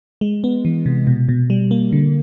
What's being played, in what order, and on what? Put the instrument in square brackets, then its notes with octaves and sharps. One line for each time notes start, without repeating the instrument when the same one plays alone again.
[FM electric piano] G#3
B3
E3
C3
B2
B2
G3
A#3
D3